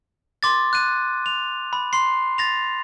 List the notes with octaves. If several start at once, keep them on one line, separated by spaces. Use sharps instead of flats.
C6 D6 A6
F#6 D#7
F7
B5
C6 C7
A6 A#6 F7